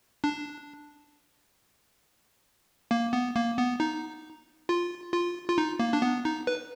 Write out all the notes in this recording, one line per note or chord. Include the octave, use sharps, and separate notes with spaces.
D4
A#3
B3
A#3
B3
D#4
F4
F4
F4
D#4
A#3
D4
B3
D#4
B4